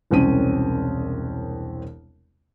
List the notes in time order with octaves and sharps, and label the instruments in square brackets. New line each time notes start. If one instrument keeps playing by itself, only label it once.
[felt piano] E1 C2 C4 C#4 D#7